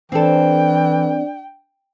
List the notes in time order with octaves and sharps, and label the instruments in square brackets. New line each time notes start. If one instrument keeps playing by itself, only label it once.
[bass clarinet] E3 [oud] C4 A4 [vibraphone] D4 D5 [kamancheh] G5